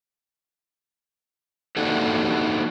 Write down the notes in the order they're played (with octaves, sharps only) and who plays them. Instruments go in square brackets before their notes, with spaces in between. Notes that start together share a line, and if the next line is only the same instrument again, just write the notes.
[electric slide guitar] A#3 D4 D#4 F#4 G4 A4